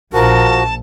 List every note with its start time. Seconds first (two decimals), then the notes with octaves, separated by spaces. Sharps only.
0.13 A#1 F3 F#4 A#4 A5